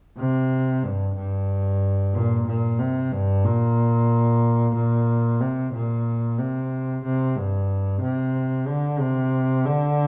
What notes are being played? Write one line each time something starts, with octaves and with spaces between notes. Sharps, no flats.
C3
G2
G2
A#2
A#2
C3
G2
A#2
A#2
C3
A#2
C3
C3
G2
C3
D3
C3
D3